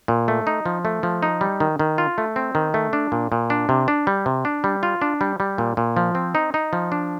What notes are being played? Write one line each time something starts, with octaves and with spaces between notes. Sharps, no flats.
A#2
A3
D#4
F3
A3
F3
D#4
G3
D#3
D#3
F4
A3
C4
D#3
A3
D4
A#2
A#2
D4
C3
D4
G3
C3
D4
G3
F4
D4
G3
G3
A#2
A#2
F3
C4
D#4
D#4
F3
D4